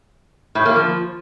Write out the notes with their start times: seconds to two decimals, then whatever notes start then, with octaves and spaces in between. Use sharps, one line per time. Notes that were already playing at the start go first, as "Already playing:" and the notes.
0.55 A2
0.65 A#3
0.76 F3